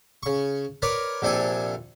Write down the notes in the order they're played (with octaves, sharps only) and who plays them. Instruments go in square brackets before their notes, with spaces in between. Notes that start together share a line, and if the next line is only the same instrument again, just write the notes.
[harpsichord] C#3 C#6
A#4 B4 C#5 D5
A#1 C3 D4 A4 G#5